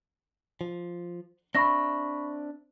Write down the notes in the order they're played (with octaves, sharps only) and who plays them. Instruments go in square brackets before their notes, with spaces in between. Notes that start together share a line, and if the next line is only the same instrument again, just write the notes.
[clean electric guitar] F3
[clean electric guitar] C4 D4 E5 [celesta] B5 C#6 A#6